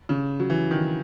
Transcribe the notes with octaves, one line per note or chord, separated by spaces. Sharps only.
C#3
F#3
E3
D#3